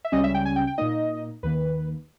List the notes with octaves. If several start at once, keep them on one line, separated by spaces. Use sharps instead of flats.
E5
C#2 C#3 G3 C#4 D#5
E5
G5
G#5
G5
G5
A#2 A#3 D#4 D#5
D#2 D#3 A#3 B4